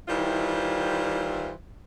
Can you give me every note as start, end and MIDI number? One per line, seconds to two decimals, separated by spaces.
0.08 1.52 51
0.08 1.52 52
0.08 1.52 55
0.08 1.52 64
0.08 1.52 65
0.08 1.52 72